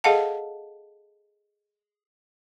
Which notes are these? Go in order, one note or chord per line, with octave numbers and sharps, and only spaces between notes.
G#4 A4 D#5 F5 F#5 A5